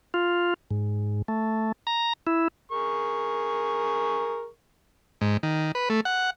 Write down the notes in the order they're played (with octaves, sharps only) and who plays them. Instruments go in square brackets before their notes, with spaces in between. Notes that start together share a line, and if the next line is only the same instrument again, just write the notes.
[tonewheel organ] F4
G#2
A3
A#5
E4
[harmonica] G#4 A#4 C#6
[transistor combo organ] G#2
D#3
B4
A3
F#5